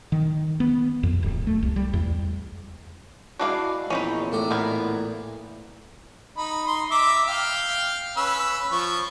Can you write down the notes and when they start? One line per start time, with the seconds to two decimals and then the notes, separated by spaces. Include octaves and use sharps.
0.12 D#3
0.60 B3
1.03 F2
1.23 D1
1.47 A3
1.63 C2
1.76 G3
1.93 E2
3.40 G#3 D4 E4 F#4 D5 F5
3.90 E2 A#2 E3 F3 C4 C#4 D#4 B5
4.32 A2 D4 A#5
4.51 B3 E4 A#4 C5
6.37 D#4 B5
6.67 D#4 C6
6.91 E5 A#5 D6
7.27 F5 G5
8.17 C#4 B4 E6
8.72 F3 C#6